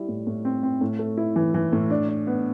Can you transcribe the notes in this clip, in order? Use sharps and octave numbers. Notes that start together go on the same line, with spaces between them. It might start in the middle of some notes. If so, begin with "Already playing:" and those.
Already playing: G3 E4
A2
A2
C4
C4
A2
A3
E4
E3
E3
A2
D4
D4
B3